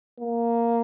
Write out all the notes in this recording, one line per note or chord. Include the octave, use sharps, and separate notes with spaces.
A#3